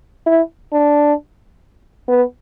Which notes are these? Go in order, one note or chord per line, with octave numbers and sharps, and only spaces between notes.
E4
D4
B3